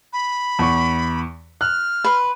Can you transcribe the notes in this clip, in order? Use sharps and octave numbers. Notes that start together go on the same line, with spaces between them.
B5
E2 C#6
F6 F#6
B4 C6